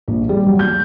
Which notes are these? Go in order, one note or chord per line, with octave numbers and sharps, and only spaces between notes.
A#1
G3
F#3
G6